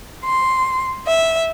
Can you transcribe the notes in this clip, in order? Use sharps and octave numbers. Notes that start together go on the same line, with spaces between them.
C6
E5